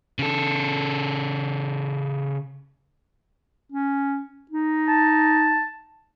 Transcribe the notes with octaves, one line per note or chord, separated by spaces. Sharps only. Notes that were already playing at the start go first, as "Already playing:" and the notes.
C#3 A4
C#4
D#4
A5